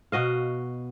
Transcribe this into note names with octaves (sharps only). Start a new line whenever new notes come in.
B2 F#4 D#5 F5